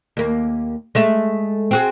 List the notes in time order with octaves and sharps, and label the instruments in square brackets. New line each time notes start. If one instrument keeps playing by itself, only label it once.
[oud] D#2 A#3
G#3 A3 E5
C4 F#4 G#4